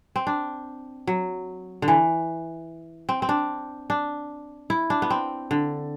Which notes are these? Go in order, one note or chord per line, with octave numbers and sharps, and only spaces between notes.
C4
D4
F#3
D3
E3
C4
C4
D4
D4
E4
D4
B3
C4
D3